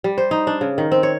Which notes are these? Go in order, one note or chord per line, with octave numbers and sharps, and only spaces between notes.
G3
C5
D#4
D4
C#3
D#3
C4
C#5